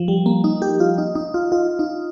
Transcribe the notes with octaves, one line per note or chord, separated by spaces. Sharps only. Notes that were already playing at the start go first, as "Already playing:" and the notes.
Already playing: F3
G3
A#3
D#4
G4
F4
D#4
D#4
F4
F4
D#4